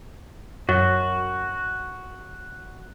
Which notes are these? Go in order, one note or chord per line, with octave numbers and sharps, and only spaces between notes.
F#2 F#4